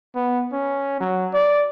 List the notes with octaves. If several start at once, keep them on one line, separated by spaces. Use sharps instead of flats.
B3
C#4
F#3
D5